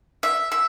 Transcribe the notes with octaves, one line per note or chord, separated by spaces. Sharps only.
E5
E5